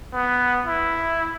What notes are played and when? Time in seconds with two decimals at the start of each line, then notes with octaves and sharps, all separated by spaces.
0.13 B3
0.66 E4